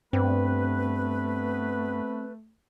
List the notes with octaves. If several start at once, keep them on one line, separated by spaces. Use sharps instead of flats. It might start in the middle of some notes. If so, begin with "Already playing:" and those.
G2 A3 B3 C4 B4